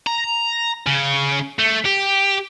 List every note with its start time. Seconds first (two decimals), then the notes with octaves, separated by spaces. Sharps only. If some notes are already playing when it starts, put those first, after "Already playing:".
0.07 A#5
0.87 C#3
1.59 A3
1.85 G4